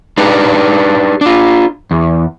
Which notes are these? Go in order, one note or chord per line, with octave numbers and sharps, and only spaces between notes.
D4 D#4 G4 B4
D4 F4
E2